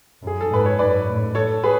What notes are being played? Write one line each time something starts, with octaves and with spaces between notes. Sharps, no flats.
F#2
G#4
A4
G#2 B4
C#5
F#2 B4 D5
A2
A4 C#5
G#4 B4